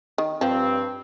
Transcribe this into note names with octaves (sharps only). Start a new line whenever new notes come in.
D#3
G2 F3 C4